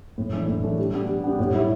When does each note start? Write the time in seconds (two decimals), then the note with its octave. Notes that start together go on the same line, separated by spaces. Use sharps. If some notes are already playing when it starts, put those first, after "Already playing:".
0.18 A2
0.33 E3 A3 D4
0.48 A2
0.63 E3 A3 D4
0.79 G3
0.94 B3 D4 G4
1.08 G3
1.24 B3 D4 G4
1.39 A2
1.54 G3 E4